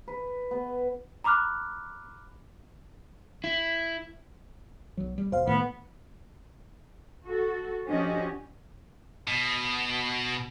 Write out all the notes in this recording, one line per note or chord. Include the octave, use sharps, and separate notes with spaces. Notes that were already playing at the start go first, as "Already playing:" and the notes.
B4
B3
A#5 B5 D6 F6 F#6
E4
B1 F#3
G3
E1 E2 B2 C5 F5
A2 D#3 A3 B3
F#4 A4
F3 C#4 D4 F#4 G4 D#5
B2